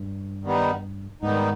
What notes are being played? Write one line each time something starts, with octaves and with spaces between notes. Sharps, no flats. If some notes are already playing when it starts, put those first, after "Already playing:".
Already playing: G2
D#3 G3 B3 D#4
G#2 D#3 G3 B3 D#4